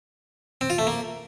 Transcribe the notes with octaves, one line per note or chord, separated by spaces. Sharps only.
C4
F4
A3
A#3